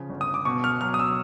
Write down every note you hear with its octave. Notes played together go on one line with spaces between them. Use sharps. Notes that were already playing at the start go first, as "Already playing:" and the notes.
Already playing: C#3 F3
G1
D#6
D6
B2 C#6
F6
F#3 F6
D#6
E6